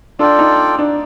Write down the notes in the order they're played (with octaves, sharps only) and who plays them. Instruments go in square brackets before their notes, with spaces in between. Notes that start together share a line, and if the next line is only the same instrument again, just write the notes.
[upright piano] D4 [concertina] F4 A4 D5 G5
[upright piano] D#4
D4